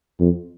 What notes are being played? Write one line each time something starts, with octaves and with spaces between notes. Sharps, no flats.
F2